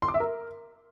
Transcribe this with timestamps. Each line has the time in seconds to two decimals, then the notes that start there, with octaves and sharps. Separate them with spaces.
0.02 C6
0.08 D6
0.14 E5
0.20 A#4